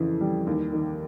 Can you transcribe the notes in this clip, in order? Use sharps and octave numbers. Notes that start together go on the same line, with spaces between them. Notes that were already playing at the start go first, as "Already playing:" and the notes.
Already playing: F2 C#3 E3
G3
D#2
D#3